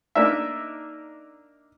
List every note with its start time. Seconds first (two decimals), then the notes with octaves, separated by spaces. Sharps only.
0.15 A#3 D4 D#4 E5